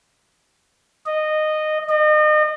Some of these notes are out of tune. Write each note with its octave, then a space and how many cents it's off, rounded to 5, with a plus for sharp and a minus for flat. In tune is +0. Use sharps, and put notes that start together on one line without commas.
D#5 -15
D#5 -35